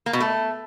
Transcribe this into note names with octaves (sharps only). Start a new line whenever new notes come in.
A#3
B2
A3